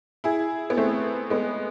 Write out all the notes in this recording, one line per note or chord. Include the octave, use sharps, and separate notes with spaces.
E4 G#4
B3
A3 C4
G#3 B3